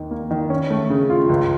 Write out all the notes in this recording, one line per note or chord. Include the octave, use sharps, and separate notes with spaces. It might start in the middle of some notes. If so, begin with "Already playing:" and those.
Already playing: D#2 D#3
A#3
D#3
C#4
A3
C#3
F4
C#2